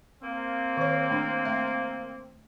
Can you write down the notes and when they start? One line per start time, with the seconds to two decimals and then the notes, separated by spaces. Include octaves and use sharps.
0.23 A#3 C4
0.77 D#3 C#5
1.10 A3 D4
1.45 A3 E5